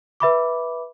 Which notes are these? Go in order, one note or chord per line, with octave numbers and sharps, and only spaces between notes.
B4 E5 B5 D6